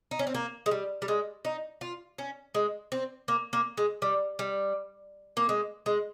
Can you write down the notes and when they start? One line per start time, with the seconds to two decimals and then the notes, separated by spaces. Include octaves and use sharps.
0.11 D#4
0.19 C#4
0.27 C4
0.35 A#3
0.66 G#3
0.71 G3
1.02 G3
1.08 G#3
1.45 D#4
1.81 F4
2.18 C#4
2.54 G#3
2.92 C4
3.28 A#3
3.53 A#3
3.77 G#3
4.02 G3
4.39 G3
5.37 A#3
5.49 G#3
5.86 G#3